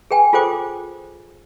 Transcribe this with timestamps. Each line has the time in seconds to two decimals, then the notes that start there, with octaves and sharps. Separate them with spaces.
0.11 G#4 B4 G5 G#5
0.33 F4 G#4 A4 C5 G5 D6